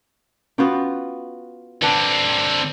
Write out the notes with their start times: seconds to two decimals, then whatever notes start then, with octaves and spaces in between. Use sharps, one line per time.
0.58 B3 C#4 F4 F#4 G5
1.82 D3 C4 D4 B4 F#5